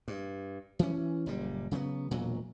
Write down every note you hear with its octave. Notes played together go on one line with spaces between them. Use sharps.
G2
E3 C#4
F#1 A#2 G3
C#3 F#3 G#3 B3
E1 A#2 F#3